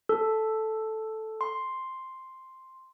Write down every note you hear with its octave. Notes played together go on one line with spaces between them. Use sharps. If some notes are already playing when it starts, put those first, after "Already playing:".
A4
C6